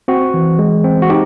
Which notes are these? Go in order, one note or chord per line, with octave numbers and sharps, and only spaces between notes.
C4 F#4
E3
G#3
C4
F#4
D#4 G4